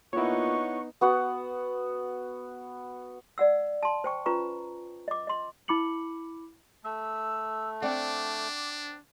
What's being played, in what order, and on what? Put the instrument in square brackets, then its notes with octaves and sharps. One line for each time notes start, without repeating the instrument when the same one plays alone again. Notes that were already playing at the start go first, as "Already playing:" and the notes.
[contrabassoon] A#2 [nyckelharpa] B3 D#4 [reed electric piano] E4 C#5 [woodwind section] F#5 C#6
[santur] B3 F#4 F#5
[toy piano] D5 F#5 E6
A5 C6
C5 G5 C#6
C#4 F4 B4 A#5 C#6
D#5 D6
D#5 C6
[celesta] E4 B5 D6 C#7 F#7
[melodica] A3 [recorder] E6
[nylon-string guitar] C4 D5 F#5 [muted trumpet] D4 [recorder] D6